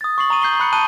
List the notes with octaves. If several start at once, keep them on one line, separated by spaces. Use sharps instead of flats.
D#6 A6
C#6 C7 F#7
A#5 C#6 D#7
G6 C7 G7
B5 F#6 C#7
A5 B5 D#6 F#6 D#7 G7